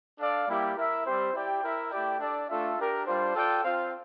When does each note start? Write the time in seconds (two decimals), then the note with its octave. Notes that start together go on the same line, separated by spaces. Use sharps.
0.18 D4 A4 D5 F5
0.47 G3 A#3 E4 G4
0.76 E4 A#4 E5
1.05 G3 C4 G4 C5
1.33 E4 G4 D5 G5
1.63 E4 A#4 E5
1.90 A3 E4 G4 D5 G5
2.20 D4 A4 D5
2.49 A3 D4 F4 A4 E5
2.76 D4 G4 A#4
3.05 G3 D4 F4 C5
3.35 F4 A4 D5 G5
3.64 C4 F4 C5 F5